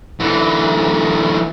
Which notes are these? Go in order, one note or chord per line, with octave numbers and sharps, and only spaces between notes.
D3 E3